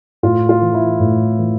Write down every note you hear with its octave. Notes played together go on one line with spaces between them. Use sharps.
A2 F4
F4
E3
E4
A2
E3